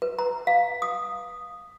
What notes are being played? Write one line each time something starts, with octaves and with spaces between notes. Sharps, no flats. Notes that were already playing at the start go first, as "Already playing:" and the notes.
B4
A#5
F5
D#6